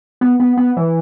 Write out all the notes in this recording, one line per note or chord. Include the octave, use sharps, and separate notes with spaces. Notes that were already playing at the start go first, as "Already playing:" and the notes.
B3
B3
B3
E3